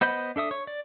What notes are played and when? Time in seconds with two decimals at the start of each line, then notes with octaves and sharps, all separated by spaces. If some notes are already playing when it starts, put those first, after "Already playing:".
0.01 B3 C5 D#5 B5 G6
0.36 D4 A4 E5 D#6
0.51 C#5
0.67 D5